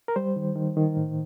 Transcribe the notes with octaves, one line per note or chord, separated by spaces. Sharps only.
A#4
G3 C5
D#3
D#3
D#3
A2